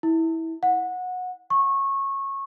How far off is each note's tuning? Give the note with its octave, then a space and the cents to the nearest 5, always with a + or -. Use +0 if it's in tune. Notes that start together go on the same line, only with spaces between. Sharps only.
E4 -20
F#5 -20
C#6 -20